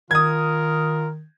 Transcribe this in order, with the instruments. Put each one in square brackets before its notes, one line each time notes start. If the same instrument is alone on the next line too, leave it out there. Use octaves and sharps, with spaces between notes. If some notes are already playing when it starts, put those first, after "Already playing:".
[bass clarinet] D#3 [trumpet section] F4 A#4 [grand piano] D#6 G#6